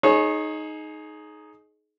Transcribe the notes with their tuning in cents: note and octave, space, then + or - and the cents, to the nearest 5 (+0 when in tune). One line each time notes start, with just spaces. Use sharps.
D#4 +0 G#4 +25 C#5 -25